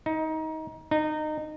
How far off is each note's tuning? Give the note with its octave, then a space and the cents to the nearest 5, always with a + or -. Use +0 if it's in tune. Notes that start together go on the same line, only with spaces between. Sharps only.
D#4 +25
D#4 -20